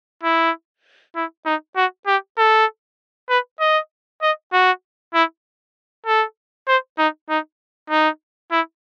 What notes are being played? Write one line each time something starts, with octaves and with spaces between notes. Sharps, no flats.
E4
E4
D#4
F#4
G4
A4
B4
D#5
D#5
F#4
E4
A4
C5
D#4
D#4
D#4
E4